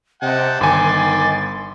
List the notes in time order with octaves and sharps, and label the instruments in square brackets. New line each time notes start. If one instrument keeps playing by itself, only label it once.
[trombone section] C3 [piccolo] D#5 [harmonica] F#5 G5 A5
[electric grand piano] G1 G#5 [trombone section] D#3 [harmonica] B5 C6 D6 [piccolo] A6